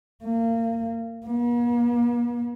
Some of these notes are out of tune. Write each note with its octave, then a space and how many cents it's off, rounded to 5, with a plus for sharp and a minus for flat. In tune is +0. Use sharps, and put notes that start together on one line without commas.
A#3 -30
A#3 +45